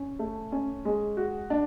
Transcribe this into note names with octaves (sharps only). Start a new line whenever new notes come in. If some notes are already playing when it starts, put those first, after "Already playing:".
Already playing: C#4
A3
C#4
G#3
F#4
D4